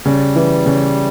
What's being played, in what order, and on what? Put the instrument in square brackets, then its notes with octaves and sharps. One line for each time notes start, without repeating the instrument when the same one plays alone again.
[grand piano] C#3 [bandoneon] G3
[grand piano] E3
C#3